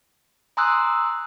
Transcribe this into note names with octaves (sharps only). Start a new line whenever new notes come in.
G#5 A#5 C6 D#6 E6 F#6